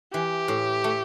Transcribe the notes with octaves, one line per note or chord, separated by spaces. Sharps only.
E3 G4
A2
A3